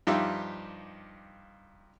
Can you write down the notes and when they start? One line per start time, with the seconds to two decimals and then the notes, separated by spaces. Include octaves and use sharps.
0.07 G2 F3 D#4 F4 G4 E5